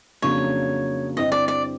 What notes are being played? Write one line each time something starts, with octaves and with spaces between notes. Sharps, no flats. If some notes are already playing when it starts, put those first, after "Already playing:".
F2 C#3 F#3 A#3 D4 C#5
G2 D3 G3 C4 E4 D#5
D5
D5